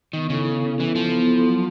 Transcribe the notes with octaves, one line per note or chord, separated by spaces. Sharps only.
D#3 B3
C#3 E4 A4
B3
E4 A4
E3 B3
F3 E4 A4
B3
E4 A4
F#3